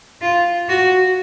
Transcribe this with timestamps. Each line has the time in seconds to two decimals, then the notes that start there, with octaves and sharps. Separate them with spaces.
0.22 F4
0.69 F#4